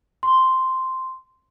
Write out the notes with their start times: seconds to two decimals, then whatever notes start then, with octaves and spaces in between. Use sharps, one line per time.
0.23 C6